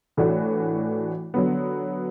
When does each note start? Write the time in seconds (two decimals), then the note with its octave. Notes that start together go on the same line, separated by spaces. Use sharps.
0.17 A2 E3 A3 D4 F#4
1.34 D3 F#3 B3